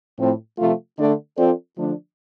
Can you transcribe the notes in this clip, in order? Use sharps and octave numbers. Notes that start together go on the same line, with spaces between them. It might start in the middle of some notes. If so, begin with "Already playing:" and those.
A2 F3 C4
C3 F3 A3 F4
D3 A3 D4 A4 D5
F3 C4 F4 A4 D5
D3 F3 A3 D4